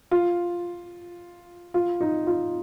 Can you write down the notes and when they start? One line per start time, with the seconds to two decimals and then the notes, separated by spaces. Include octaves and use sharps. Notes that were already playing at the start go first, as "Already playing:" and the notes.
0.11 F4
1.74 F4
2.01 D#4
2.27 F4